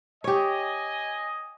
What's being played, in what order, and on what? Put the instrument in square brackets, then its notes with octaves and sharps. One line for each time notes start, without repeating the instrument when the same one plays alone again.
[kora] G4 C#5 [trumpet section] D#5 G#5